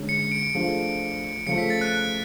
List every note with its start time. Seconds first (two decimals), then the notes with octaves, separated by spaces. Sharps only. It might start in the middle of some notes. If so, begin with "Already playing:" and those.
Already playing: D3 G#3 C#4
0.09 C#7
0.32 D7
0.55 F3 A3 D4 G#4
1.46 C#3 F3 A3 C#7
1.58 B6
1.70 A6
1.81 F#6